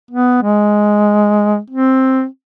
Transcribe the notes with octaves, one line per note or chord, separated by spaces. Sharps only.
B3
G#3
C4